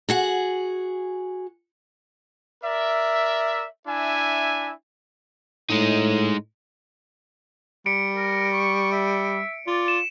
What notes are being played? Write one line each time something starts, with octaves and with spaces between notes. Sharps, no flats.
F#4 G#4 F#5
A#4 D5 E5
D4 E4 E5 G#5
A2 G#3 D#4
G3 B6 C#7 D7
A#4
C#6
E5
F4 D5
E7